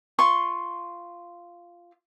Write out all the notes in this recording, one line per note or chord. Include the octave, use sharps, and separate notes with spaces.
F4 C6 C#6